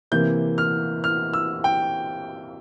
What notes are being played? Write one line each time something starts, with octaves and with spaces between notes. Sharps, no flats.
C3 E3 A#3 G6
F6
F6
E6
G5